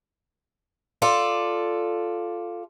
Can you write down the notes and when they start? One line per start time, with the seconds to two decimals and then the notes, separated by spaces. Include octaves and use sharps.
1.02 F4 A4 D5